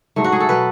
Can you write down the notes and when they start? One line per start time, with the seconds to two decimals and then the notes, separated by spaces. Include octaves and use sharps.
0.16 G#2 F#3 A3
0.24 F#4
0.32 G#4
0.40 A4
0.49 B2 F#3 B4